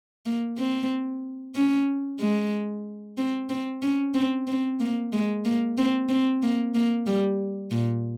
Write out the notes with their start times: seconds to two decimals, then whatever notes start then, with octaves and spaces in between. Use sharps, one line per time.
0.26 A#3
0.58 C4
1.55 C#4
2.20 G#3
3.18 C4
3.49 C4
3.82 C#4
4.14 C4
4.47 C4
4.80 A#3
5.13 G#3
5.45 A#3
5.78 C4
6.09 C4
6.42 A#3
6.75 A#3
7.07 G3
7.71 A#2